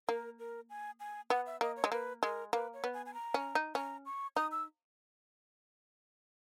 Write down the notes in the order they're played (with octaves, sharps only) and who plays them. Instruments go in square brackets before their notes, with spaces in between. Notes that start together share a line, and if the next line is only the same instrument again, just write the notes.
[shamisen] A#3 [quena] A#4
[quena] A#4
G#5
G#5
[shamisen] B3 [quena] F#5
[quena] E5
[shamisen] A#3 [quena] D#5
[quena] C#5
[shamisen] G#3
[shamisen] A#3 [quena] B4
[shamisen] G#3 [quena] A#4
[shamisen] A#3 [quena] B4
[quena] C#5
[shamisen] B3
[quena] G#5
G#5
A#5
[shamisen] C#4
D#4
[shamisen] C#4 [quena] A#5
[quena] C#6
[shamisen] D#4 [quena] D#6
[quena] E6